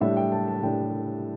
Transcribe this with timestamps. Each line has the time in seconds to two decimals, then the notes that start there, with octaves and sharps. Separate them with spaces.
0.01 A2 G3 D4 E5
0.17 G5
0.32 A5
0.48 A5
0.62 A2 G3 D4 G5